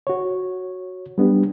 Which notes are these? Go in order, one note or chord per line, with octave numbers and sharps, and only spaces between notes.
F#4 C#5
G3 B3 D4 G4